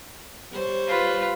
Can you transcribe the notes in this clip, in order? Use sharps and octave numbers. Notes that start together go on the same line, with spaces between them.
G3 C5 C#5
F4 B4